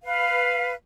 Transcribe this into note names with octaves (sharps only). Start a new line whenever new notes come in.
B4 F5